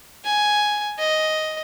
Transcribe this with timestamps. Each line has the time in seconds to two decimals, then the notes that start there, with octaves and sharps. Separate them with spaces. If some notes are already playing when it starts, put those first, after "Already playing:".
0.25 G#5
0.99 D#5